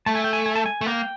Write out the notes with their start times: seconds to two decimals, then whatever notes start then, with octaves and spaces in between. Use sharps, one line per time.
0.06 A3 A5
0.15 G#5
0.24 G5
0.33 G#5
0.46 G#5
0.56 A5
0.66 G#5
0.81 A3
0.86 A#3 G5